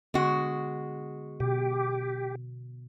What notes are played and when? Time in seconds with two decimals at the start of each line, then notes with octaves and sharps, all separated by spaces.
0.14 D3 G#3 B3 F#4
1.40 B2 G4